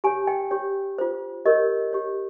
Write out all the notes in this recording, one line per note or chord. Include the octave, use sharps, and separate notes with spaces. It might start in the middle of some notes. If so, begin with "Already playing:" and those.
G4 C#5 G#5
G5
G4 C#5
F4 C5
G4 A#4 C#5 D#5
G4 C#5